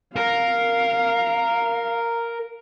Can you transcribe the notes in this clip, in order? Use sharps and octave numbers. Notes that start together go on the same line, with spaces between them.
A#4 F5